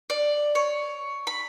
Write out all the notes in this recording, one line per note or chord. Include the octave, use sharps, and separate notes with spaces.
D5
C#5
B5